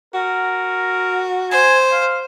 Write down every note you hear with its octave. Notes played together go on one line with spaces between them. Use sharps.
F#4 A#4
C5 G#5
F5